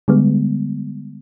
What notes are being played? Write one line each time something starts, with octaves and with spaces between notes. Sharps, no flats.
D3 G3 G#3 B3